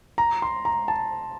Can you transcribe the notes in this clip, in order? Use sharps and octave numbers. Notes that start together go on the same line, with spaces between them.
A#5
C6
A#5
A5